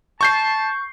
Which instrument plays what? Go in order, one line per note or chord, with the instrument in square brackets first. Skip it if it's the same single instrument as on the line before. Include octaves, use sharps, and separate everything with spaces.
[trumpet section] A5 [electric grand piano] C#6 G6 C7